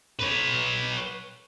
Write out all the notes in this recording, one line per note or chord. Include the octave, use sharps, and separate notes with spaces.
B4 C#5